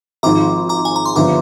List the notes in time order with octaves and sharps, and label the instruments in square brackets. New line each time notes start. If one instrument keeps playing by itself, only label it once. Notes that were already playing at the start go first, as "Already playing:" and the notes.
[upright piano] G#1 G#2 F3 [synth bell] A#5 D6
[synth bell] A#5 D6
G#5
A#5
C6
[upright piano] G1 D3 F3 [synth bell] A#5 D6